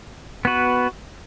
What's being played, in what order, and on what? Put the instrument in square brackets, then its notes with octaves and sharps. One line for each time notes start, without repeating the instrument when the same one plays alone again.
[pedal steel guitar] B3 F#4 B4